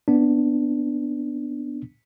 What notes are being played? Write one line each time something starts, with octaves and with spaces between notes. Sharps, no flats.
B3 D4